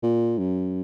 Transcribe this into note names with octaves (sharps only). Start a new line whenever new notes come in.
A#2
F#2